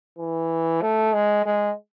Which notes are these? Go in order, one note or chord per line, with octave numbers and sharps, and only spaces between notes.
E3
A3
G#3
G#3